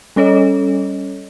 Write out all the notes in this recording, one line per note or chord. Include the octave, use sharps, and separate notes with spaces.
G3 C#4 A4 C#5 D#5